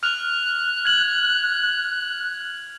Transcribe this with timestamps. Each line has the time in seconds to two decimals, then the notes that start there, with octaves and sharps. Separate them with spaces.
0.03 F6 F#6 F7
0.85 G#6 F#7